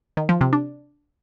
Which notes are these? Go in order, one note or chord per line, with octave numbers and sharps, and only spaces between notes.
D#3
F3
C3
D4